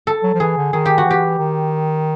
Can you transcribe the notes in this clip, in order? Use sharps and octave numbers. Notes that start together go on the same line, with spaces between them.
A4
F#3
F3
E3 G#4
D3
D#3 G#4
G4
F#4
E3
G4
D#3